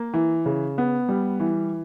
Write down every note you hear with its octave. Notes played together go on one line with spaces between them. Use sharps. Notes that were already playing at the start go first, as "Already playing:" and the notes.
Already playing: A#3
E3
C#3
B3
G3
E3